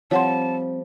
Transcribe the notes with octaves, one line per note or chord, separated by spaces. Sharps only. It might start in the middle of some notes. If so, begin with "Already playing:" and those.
F3 G3 C4 C#5 F#5 A5 C6